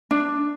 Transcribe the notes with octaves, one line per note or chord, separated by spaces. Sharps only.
D4